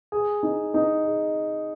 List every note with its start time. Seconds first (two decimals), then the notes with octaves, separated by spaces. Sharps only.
0.12 G#4
0.43 D#4
0.74 D#4
1.05 G#4